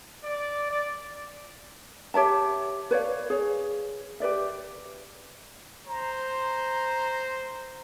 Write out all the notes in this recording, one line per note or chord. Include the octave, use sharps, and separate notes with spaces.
D5
D5
G4 C#5 E5 A5
B4 C#5 D5 F5
G#4 C#5
G4 B4 D5 E5
C5 A#5